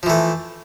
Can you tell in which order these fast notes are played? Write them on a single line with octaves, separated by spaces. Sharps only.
F3 E3 A3